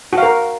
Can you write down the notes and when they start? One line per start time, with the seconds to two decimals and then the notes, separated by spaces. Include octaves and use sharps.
0.13 F#4
0.18 F5
0.23 A#4